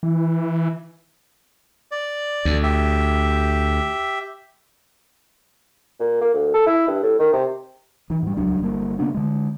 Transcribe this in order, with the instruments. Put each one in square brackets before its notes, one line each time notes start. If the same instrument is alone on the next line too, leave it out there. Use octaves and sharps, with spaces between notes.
[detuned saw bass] E3
[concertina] D5
[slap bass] D2
[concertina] G4 E5
[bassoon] A#2
A#3
D2
A4
E4
G2
A2
D#3
C3
[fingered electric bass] D#3 E3
G#2 G3
D#1 C#2 F#3 D4
G1 G3 A#3
C#3 A#3 B3 D4
D3 G#3